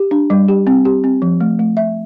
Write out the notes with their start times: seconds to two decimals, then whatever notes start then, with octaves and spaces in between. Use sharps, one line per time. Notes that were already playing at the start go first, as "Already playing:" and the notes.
Already playing: G4
0.11 D4
0.30 G3
0.48 G4
0.67 C4
0.85 G4
1.04 C4
1.22 F3
1.41 A3
1.59 A3
1.77 E5